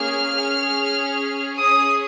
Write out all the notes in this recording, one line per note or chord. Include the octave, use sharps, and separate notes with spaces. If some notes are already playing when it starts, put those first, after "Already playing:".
Already playing: A#3 C#4 G#4 F6
C#4 G#4
C#4 G#4 D#6